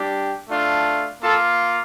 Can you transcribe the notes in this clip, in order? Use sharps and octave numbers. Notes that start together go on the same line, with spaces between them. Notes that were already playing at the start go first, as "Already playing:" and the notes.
Already playing: G3 D4 G4
A3 D4 F4
A#3 F4 A4 A5